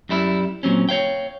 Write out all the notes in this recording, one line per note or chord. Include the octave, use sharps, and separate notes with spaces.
F#2 G3 E4 G#4 E5
A#2 F#3 C4 C#4
C#5 F5 G5